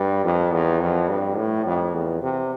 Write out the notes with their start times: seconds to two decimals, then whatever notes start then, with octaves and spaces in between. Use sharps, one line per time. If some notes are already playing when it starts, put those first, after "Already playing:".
Already playing: G2
0.24 F2
0.53 E2
0.81 F2
1.09 G2
1.37 A2
1.66 F2
1.93 E2
2.22 C3